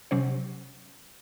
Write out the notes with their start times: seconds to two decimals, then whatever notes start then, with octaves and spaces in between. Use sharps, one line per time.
0.11 C3 F#3 C#4 C5